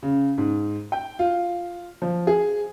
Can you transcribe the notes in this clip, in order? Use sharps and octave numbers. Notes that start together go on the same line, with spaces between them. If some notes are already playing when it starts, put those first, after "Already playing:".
C#3
G#2
G5
F4
F3
G#4